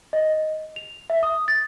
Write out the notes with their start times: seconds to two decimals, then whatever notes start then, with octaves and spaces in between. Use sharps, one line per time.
0.13 D#5
0.76 F7
1.10 E5
1.23 D#6
1.48 A6